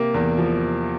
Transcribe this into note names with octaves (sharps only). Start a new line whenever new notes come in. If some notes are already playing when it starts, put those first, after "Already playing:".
Already playing: C3 A#3
E2
F3